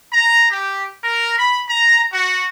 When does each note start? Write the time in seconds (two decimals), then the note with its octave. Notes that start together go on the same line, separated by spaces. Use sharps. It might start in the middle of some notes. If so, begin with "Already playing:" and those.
0.11 A#5
0.50 G4
1.03 A#4
1.37 B5
1.67 A#5
2.12 F#4